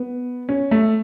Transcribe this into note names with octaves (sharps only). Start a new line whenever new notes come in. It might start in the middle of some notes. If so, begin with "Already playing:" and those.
Already playing: B3
C#4
A3